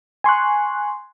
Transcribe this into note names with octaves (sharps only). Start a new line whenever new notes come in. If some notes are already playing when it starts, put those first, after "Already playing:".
G#5 C6 C#6 F#6